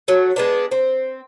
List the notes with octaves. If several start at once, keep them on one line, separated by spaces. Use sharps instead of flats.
F#3 A3
G#3 B3 D4
C4